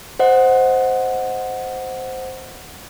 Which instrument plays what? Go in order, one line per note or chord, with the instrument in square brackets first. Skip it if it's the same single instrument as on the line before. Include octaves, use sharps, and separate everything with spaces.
[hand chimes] C5 D#5 F#5